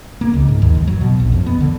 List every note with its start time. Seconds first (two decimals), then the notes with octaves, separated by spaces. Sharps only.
0.21 A#3
0.34 C#2
0.49 G#2
0.62 D#2
0.75 F#1
0.88 F#3
1.01 B2
1.20 A#1
1.32 F2
1.46 B3
1.61 D3